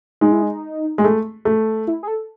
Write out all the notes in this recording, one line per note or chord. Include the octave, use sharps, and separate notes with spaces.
G#3 D#4
E4
D#4
G#3
A3
A3
E4
G#4
A4